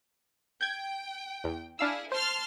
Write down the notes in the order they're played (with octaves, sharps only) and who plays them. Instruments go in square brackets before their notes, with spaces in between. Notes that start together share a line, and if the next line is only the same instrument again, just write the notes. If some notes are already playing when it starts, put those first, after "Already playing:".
[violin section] G5 [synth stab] G6 G#6
[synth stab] E2
[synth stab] D4 F5 E6 [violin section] E4 G#4
[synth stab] C5 [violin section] A5 C6 F6